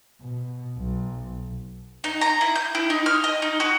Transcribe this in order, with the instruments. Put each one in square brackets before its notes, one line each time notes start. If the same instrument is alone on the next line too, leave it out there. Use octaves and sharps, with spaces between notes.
[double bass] B2
B1
[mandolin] D#4
A#5
E4
G6
E4
D#4
F6
D#5
D#4
F#4